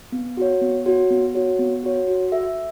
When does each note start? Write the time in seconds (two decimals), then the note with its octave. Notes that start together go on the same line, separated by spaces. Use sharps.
0.12 B3
0.37 F#4 C#5
0.61 B3
0.86 F#4 C#5
1.10 B3
1.35 F#4 C#5
1.59 B3
1.84 F#4 C#5
2.07 F#4
2.32 A4 E5